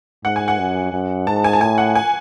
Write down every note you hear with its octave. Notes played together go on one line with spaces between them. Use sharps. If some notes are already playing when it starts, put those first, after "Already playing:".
G#2 F#5
G#5
F#5
F#2
F#2
G#2 A5
G#5
A5
A2 G#5
F#5
G#5